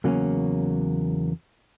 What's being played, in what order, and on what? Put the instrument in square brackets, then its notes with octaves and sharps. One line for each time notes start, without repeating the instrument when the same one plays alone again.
[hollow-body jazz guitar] E2 C#3 F#3 A#3 C#4